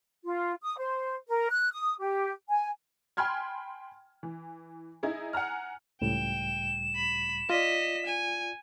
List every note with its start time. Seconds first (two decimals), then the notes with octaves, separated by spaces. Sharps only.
0.24 F4
0.62 D#6
0.79 C5
1.29 A#4
1.50 F#6
1.73 D#6
2.00 G4
2.49 G#5
3.17 G5 G#5 B5 C6 F6 G#6
4.23 E3
5.03 D#4 E4 G#4
5.33 F#5 G#5 A#5 F6
6.01 C#2 A2 G3 G5 E7
6.95 B5
7.50 F4 D5 D#5 B6
8.07 G#5